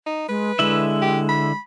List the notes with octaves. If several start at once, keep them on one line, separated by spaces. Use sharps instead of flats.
D#4
G#3 B4
D3 G#3 E4 E5
G4
B5